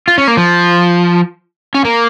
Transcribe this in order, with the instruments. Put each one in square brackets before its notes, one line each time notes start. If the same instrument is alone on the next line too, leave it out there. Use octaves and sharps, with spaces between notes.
[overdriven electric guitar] F4
C#4
A#3
F3
C#4
A#3